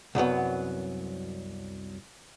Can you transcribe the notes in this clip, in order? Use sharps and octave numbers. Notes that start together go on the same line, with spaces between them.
C2 F#2 F#3 B3